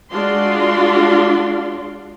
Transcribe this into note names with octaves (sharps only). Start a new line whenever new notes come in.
G#3 D4 F4 F#4 D5 C6